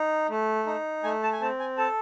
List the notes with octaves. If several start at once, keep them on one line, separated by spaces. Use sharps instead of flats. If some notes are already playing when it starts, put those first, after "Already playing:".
Already playing: D#4
A3
D#4
A3 G#5
A5
G#5
C4 A5
G#5
A4 A5